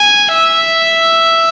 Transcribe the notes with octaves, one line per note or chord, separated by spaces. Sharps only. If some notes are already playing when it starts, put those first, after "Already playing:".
Already playing: G#5
E5